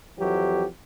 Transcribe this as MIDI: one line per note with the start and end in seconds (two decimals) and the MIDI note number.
0.18 0.65 41
0.18 0.65 52
0.18 0.65 54
0.18 0.65 67